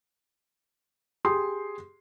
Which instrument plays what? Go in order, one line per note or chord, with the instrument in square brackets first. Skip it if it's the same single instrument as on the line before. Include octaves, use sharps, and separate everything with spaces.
[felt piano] G4 G#4 C6 D#6